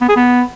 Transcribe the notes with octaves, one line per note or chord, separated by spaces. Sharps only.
B3
G#4
B3